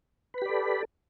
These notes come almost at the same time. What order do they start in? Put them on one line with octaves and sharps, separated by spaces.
B4 B5 G4 D5 A4